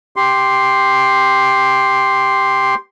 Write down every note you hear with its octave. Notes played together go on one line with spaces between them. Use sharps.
G4 C6